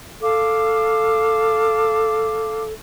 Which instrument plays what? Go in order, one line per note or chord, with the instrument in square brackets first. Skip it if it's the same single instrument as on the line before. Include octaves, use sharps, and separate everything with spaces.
[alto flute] A4 [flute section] F5 A5 D6